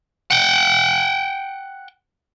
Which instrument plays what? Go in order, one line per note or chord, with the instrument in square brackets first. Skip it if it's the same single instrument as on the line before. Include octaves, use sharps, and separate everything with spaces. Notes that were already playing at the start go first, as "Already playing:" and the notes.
[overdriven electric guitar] F#5 G5